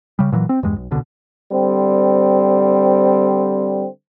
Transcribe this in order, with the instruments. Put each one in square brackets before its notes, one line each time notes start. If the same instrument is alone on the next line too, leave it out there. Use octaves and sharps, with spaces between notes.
[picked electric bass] C#3 G3
A#2 E3 F#3
C4
E2 G2 G#3
B1
D#1 C2 B2 D3
[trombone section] D3 G3 C4